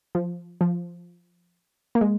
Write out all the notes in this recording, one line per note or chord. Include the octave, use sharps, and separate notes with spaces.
F3
F3
A#3
G#3